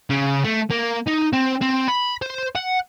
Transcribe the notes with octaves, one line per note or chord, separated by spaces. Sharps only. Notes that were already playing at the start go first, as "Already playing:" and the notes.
C#3
A3
A#3
D#4
C4
C4
B5
C5
F#5